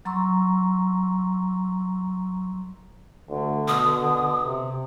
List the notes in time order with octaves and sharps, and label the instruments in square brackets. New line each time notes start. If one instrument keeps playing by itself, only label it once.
[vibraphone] F#3 A#5 C6 C#6 E6
[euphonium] D2 [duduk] D3
[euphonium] B2 [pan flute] D#6
[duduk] C3